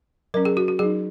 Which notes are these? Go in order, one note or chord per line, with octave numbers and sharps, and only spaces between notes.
F#3 C#4 A#4
G#4
F#4
F#4
F#3 D#4 G#4